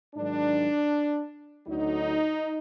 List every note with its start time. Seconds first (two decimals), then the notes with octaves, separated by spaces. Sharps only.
0.15 G#2 D#3 F#3 D4
1.66 D2 D3 F#3 D#4